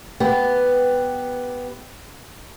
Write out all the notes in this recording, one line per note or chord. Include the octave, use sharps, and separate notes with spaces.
B3 G4